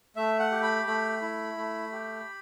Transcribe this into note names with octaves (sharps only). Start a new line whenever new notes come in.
A3 E5
F#5
G4
B5
A3 B5
E4
A3
G4